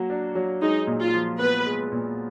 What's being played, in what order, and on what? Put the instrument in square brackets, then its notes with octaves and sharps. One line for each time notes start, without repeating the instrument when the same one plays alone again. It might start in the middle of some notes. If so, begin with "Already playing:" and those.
Already playing: [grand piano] F#3 A#3 F#4
D4
F#3
[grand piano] G#3 [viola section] D#4
[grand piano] A#2
[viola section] F4
[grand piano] F3
[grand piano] B3 [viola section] B4
[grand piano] G#3
A#2